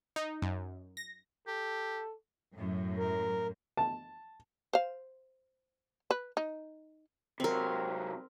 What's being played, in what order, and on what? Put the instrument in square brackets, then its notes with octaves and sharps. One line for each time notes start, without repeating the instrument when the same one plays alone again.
[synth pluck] D#4
F#2
A#6
[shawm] G4 [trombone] A4
[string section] F#2 A2
[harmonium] A#4
[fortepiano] A5
[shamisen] C5 F5
B4
D#4
[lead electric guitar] C3 F#3 [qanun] C4 A#4